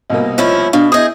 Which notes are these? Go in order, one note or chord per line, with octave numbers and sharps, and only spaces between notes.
C2 B2 A#3 D#5
F3 C#4 E4
B2 D4 F5
E4 G#4 D#5 D#6 G6